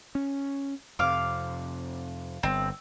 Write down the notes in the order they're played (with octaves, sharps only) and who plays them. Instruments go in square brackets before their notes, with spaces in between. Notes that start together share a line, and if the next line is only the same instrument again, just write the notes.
[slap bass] C#4
[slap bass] F2 C3 [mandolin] F5 D6
[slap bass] G1 [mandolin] C4